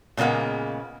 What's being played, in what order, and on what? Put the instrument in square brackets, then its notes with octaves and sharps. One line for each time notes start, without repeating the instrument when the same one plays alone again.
[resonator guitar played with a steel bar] A#2 C#3 G#3 A#3 B3